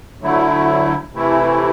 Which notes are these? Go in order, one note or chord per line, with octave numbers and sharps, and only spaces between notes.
D2 D3 F#3 A3 E4
C3 E3 A3 E4